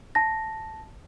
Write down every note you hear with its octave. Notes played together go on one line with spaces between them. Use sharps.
A5 A#6